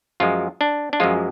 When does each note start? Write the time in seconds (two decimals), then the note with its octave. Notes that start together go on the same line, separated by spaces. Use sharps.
0.20 F#2 F3 G#3 F4
0.61 D4
0.93 D4
1.00 F#2 F3 G#3 F4